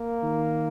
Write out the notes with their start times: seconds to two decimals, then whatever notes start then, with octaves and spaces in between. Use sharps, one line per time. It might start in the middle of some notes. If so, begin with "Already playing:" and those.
Already playing: A#3
0.23 D#3